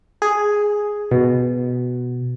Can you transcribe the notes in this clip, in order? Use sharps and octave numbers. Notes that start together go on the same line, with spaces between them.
G#4
B2